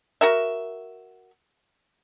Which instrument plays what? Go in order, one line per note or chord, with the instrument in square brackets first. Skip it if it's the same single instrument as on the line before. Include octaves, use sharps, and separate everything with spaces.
[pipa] F#4 A#4 E5